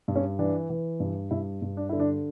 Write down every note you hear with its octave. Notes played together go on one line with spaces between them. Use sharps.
G2
C#4
E3 D4
E3
G2
G2 E4
G2
D4
D3 E4
D4